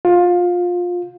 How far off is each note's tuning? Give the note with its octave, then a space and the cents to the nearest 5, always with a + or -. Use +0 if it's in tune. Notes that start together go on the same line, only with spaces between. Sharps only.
F4 +20